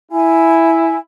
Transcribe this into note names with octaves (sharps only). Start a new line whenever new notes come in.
E4 G#5